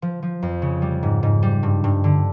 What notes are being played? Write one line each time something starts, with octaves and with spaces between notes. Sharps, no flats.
F3
F3
F2
C#3
G3
G#2
G#2
G3
G2
G2
D3